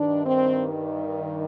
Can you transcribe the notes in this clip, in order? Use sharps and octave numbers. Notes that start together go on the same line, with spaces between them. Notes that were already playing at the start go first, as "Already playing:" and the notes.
Already playing: G2 D#3 D4
C4